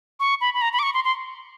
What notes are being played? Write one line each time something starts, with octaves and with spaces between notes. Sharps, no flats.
C#6
B5
B5
A#5
B5
D6
C#6
C6
C6